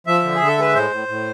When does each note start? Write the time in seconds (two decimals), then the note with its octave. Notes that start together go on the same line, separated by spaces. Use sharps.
0.07 F3 E5
0.24 D3
0.35 G#4
0.40 D3
0.47 A4
0.58 G#3 B4
0.75 A2 C5
0.91 A2
1.08 A2